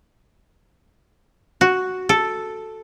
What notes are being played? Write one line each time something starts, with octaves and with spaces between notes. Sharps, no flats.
F#4
A4